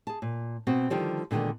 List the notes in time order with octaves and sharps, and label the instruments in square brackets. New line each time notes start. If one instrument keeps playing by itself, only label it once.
[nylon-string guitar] G#4 A5
A#2
B2 C4 F#4
D3 D#3 F3 G3
A#2 D3 D#3 G#3 B3